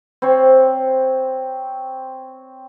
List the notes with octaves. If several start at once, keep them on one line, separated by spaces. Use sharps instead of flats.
C4 C5 C#5